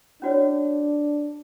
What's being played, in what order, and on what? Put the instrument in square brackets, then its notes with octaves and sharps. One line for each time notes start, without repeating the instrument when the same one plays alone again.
[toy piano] C#4 F#4 C#5 [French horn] D4